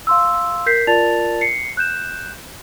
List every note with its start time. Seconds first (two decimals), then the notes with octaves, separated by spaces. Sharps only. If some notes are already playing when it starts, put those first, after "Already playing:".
0.07 F5 C6 E6
0.66 A#4 G6 B6 C7
0.87 F4 A#4 D5 A5 A6 F7
1.41 C7 C#7
1.77 F#6 G6 E7